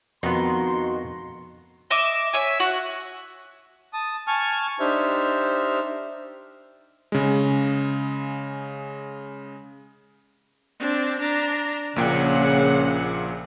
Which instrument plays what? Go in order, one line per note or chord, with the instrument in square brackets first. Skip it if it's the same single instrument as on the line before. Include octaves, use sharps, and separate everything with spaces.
[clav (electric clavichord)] F2 B3 [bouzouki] D#3 [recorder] F#4 [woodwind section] C6
[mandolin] D#5 E5 D6
C#5 E5 G#5
F#4 F#5
[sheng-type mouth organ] A5 D#6
G#5 A5 C#6 F6
D4 D#4 G4 C5 E5 F6
[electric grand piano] C#3 G#3
[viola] C4 D4
D4 A#5
[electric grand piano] A#1 A#2 G5 [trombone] C#3 [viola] A#3 F#5